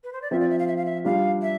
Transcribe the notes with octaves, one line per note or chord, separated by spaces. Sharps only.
B4
C5
D5
F3 C4 F4 E5
D5
E5
F5
E5
F5
E5
G3 D4 F4 F5
E5